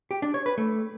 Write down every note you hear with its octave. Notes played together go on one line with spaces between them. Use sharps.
G4
D4
C#5
B4
A3